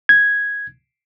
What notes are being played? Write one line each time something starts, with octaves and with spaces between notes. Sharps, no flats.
G#6